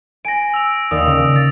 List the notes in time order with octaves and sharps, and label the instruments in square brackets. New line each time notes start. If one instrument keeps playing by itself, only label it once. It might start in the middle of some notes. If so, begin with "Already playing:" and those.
[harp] G#5 [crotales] A#6 D7
[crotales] E6 F7
[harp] D#2 D5 [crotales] D#6
[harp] C#3
[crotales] A6